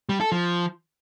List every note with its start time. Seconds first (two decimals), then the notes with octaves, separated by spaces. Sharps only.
0.09 G3
0.21 A4
0.32 F3